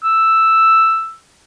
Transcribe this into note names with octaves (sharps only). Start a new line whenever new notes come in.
E6